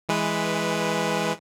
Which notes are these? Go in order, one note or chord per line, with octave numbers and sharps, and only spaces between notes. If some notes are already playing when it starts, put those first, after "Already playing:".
E3 G#3 B4